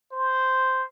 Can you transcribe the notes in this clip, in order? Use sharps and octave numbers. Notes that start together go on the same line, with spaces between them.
C5